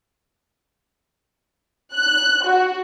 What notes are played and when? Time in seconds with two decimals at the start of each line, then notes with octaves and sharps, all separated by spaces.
1.93 F#6
2.44 F#4